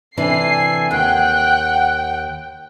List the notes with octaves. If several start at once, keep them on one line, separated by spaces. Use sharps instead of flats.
C3 E3 D4 A4 G5 G#5 C7
D#2 F#5 G5 F#6